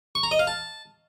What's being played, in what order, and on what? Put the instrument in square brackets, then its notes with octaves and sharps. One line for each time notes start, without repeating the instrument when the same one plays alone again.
[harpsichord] C#6
A#5
D#5
F5
A5